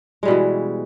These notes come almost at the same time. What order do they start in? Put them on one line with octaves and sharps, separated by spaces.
G#3 G3 B2 E3